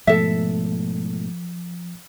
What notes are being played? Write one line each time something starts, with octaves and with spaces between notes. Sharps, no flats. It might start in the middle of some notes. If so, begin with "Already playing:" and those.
G#2 B2 F3 A3 A4 E5